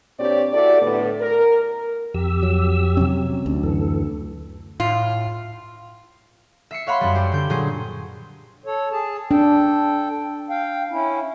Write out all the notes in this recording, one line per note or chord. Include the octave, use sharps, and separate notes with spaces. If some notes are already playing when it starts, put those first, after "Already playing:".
A#2 C4 D4 G4 C#5 D5
E4 F#4 G4 A4 D5
A2 D3 B3
A#4
F2 G4 E6
F#3
C3 F#3 C#4
D2
F#2 E3 A4
A2 F4
E5 C7 C#7
C#5 F5 F#5 B5 C6
F#2 G3
G4 C5
D3 G6
A#2 F#3 G#4 C5
A4 C#5
G#4 A5
D4 A4 G5
F5 G5
C#4 E4